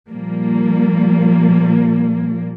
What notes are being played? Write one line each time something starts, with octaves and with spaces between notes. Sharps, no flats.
A#2 F3 G3 A#3